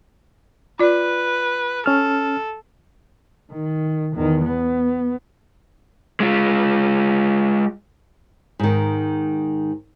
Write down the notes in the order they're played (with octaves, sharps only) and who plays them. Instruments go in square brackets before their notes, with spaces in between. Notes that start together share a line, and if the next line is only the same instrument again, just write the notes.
[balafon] F4 D5 [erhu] B4
[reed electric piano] C#4 F6 [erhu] A4
[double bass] D#3
E2 D#3
B3
[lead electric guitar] G#3 F4
[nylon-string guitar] G#2 D#3